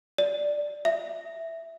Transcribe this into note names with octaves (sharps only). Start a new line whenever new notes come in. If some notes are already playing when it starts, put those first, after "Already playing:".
D5
E5